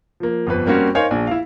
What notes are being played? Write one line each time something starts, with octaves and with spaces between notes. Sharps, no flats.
F3 A#3
G1 F2 B4
G3 A#3 C4 C#4 F#4
D#4 A#4 C5 C#5 F5 G#5
A#1 D4 G#5
E4 F5